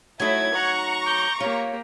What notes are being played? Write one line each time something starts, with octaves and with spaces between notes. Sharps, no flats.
F#3 A3 D#4 E4 G#6
F#5 A#5 C#6
D6 G6
A#3 F4 G4 C#5